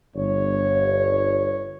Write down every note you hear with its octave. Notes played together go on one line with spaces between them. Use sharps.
G1 C#5